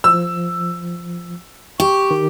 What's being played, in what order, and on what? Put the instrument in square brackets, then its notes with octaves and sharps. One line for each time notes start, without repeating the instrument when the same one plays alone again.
[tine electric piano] F3 [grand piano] E6
[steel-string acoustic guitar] G4 [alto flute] C#6
[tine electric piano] D#3